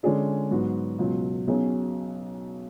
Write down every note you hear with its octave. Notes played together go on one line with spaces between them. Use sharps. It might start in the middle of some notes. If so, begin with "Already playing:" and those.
D3 G#3 C#4 G#4 D5
G#2 F#3 B3 F#4
C#2 B2 F#3
B1 B2 F#3 C#4 G#4